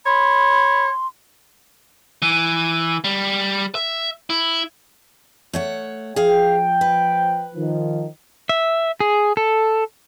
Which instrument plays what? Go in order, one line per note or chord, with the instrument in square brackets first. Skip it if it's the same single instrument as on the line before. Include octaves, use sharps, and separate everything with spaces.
[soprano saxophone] C#5 [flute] B5 [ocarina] C6
[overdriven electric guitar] E3
G3
E5
E4
[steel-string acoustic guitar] A3 C#5 F#5
[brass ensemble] F3 G5 [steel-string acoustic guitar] G#4 F5
[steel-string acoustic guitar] B4
[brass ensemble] D#3 F3
[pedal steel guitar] E5
G#4
A4